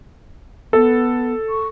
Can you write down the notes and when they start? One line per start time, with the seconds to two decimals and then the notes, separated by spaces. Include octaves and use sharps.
0.73 B3 A4
1.49 C#6